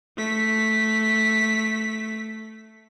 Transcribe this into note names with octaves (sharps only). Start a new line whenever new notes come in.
A3 B6